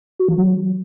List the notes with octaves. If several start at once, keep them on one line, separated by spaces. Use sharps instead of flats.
F#4
E3
F#3